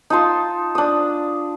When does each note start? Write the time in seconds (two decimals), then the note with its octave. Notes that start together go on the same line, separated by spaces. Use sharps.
0.10 D#4 F4 A5 C6
0.75 D4 D#6